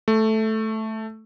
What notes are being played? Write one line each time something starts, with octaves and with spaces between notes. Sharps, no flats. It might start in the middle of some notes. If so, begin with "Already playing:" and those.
A3